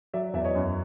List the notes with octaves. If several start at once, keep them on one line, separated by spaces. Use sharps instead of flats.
F#3 D5 E5
E2 D5 E5
C#5 D#5
F#2